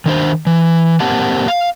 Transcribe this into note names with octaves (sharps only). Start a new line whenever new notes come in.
D#3 D4 C5
E3
A#3 C4 G4 F#5 A5
F5